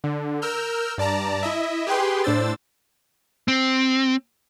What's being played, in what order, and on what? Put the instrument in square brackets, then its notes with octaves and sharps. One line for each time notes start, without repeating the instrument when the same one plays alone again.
[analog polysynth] D3
A#4 E6 F6 G6
G2 D5 A5 A#5
E4 D#5 E5
G4 G#4 B4 G5 C6
A2 D4 C5 E6 A6
[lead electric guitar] C4